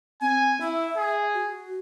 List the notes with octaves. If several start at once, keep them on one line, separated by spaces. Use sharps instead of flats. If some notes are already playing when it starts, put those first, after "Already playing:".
C4 G#5
E4 E5
G#4
F#4